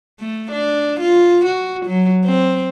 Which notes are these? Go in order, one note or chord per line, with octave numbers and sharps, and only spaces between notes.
A3
D4
F4
F#4
F#3
C4